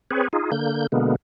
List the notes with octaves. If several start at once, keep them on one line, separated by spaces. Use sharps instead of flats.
C4 G#4 B4 C#5
D#4 F4 G#4
D3 A#3 G6
B2 D3 G#3 A#3 B3